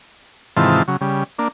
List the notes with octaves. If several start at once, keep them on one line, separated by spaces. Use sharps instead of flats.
G#2 C3 D#3 E3 F4 A5
C#3 F#3
C#3 G3
A#3 D4